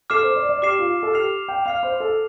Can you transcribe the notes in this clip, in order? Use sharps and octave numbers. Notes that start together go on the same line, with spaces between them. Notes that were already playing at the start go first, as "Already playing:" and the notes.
A4 D6 F6 C7 E7
C5
D5
D5
G4 D6 F6 C7 E7
F4
A4
G4 F6 C7 F7
G5
F5 F6 C7 F7
C5
A4